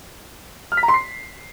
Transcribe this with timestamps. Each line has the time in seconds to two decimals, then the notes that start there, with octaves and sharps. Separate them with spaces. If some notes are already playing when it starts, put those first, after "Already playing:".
0.72 F6
0.77 B6
0.83 A#5
0.88 C6
0.94 C7